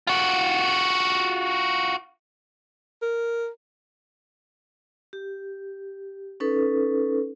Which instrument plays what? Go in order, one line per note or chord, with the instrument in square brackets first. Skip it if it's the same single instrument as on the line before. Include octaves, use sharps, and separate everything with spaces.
[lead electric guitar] F4 F#4
[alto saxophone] A#4
[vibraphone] G4
C#4 D#4 A4 B4